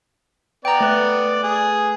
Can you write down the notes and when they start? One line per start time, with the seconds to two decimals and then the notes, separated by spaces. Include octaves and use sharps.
0.65 B3 D5 G5 A#5
0.80 A3 B4
1.43 G#4